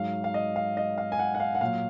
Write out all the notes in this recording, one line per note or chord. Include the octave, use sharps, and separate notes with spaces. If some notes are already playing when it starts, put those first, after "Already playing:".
Already playing: G#2 F#3 F5
F5
D#5
F5
D#5
F5
G#5
F#5
F#5
F5
F#5
A#2 F#3 F5